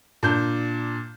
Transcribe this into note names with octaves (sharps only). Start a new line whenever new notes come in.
A#2 D4 G6